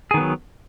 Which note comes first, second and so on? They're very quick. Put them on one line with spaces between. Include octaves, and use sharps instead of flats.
G#4 D#3 B3 F#3